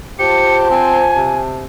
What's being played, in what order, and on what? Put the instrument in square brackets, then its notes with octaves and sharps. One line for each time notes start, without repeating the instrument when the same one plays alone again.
[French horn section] F4 C5 [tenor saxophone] G4 [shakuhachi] A5 [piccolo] C#7
[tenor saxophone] C4 [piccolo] G#5
[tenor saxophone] C3